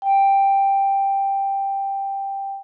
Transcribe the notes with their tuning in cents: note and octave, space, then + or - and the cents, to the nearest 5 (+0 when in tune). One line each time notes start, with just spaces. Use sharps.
G5 +5